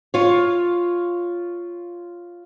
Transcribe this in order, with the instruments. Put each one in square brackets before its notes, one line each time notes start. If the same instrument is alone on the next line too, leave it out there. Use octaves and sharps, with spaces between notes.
[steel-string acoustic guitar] F4 C#5